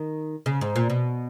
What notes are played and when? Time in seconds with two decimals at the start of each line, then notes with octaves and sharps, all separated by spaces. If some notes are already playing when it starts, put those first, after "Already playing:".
Already playing: D#3
0.46 C#3
0.61 G#2
0.76 A#2
0.90 B2